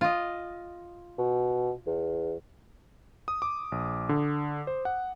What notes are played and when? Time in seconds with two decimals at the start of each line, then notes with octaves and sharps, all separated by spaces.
0.01 F4 D#5
1.18 B2
1.87 E2
3.28 D#6
3.42 D6
3.72 A#1
4.09 D3
4.67 C5
4.85 F#5